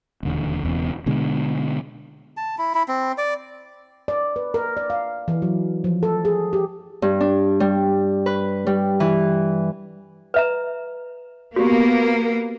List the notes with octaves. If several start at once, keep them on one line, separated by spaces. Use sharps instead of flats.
E1 D#2 D3
E1 E2 C#3
B2 D3 G#3
A5
E4
E4
C4
D5
D5
B4
A#4
D5
F5
E3
F#3
F3
A4
G#4
G4
G2
D4
G3
B4
G3
E3
B4 E5 A#5
A#3 B3 F#4 G4